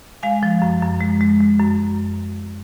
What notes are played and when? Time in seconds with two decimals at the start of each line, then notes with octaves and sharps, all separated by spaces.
0.23 G#3 F5 G#5
0.43 F3
0.62 F#2
0.82 F#2
1.01 G#3
1.21 G#3
1.41 G#3
1.60 F#2